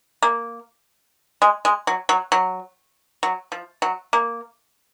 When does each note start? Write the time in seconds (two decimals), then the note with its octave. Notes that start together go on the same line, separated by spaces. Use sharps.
0.23 A#3
1.42 G#3
1.65 G#3
1.87 F#3
2.09 F#3
2.32 F#3
3.23 F#3
3.52 F3
3.82 F#3
4.13 A#3